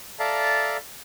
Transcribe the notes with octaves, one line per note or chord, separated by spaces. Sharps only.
A4 D5 E5 F5 A5 A#5